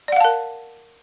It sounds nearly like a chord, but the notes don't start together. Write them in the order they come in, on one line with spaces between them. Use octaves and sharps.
D5 F#5 F5 A5 A#4